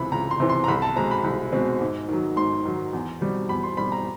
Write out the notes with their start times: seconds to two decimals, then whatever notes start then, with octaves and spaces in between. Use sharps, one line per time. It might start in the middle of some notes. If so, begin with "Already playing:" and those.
Already playing: C#2 C3 E3 B5
0.12 C#2 A#5
0.31 C6
0.40 C3 E3
0.49 C6
0.64 A#5
0.68 C2 B5
0.82 A5
0.96 B2 G#3 C4 A#5
1.11 B5
1.24 C2
1.53 B2 G#3 C4
1.81 G#2
2.08 D#3 F#3
2.36 G#2 C6
2.65 D#3 F#3
2.93 E2
3.21 B2 G3 C4
3.49 E2 B5
3.63 C6
3.77 B2 G3 C4 B5
3.92 A#5